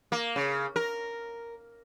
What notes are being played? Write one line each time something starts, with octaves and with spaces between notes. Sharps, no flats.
A#3
C#3
A#4